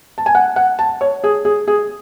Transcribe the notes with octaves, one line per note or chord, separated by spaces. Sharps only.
A5
G#5
F#5
F#5
A5
C#5
G#4
G#4
G#4